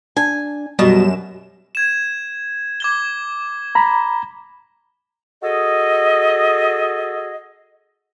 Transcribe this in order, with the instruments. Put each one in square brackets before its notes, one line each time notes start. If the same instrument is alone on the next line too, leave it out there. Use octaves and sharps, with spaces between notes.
[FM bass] D4 [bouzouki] G#5
[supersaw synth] F#2 E7 [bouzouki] B2 [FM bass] G3
[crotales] G#6 E7
D6 G#6 G7
[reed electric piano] A#5 B5
[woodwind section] F#4 G#4 A4 D#5